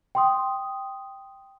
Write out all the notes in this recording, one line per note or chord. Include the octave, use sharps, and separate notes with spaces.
G5 C6 D#6